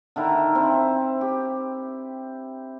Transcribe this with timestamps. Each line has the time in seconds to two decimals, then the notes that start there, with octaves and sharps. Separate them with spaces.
0.16 D3 D#3 E4 A#4
0.55 C4 E4
1.21 G4